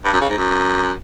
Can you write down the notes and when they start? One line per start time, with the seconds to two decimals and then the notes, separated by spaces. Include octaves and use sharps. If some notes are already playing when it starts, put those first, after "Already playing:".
0.04 G2
0.13 F#2
0.21 C#3
0.29 G#2
0.37 F#2